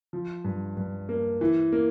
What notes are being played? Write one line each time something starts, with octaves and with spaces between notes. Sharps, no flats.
F3
G2
G2
A#3
E3
A#3